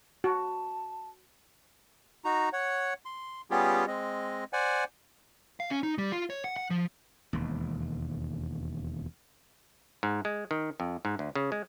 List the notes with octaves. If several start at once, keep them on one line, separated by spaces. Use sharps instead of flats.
F#4 A5
D#4 F#4 A#5
C#5 F#5
C6
G3 B3 C#4 F4 G4 G#4
G#3 C4 D#5
C5 D5 F#5 G#5
F5
C#4
D#4
G3
F4
C#5
F#5
F#5
F3
E1 D#2
G#2
G#3
D#3
F2
G#2
D2
C#3
G#3